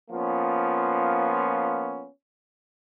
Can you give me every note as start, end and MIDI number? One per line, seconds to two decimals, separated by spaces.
0.10 2.07 53
0.10 2.07 58
0.10 2.07 59
0.10 2.07 61
0.10 2.07 65